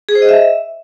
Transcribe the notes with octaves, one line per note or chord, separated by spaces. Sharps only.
G#4
C5
D#5
E5